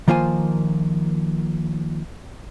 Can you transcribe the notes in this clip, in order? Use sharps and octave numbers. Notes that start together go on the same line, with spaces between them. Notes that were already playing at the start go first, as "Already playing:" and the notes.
D#3 F3 A#3 F4 C5 G#5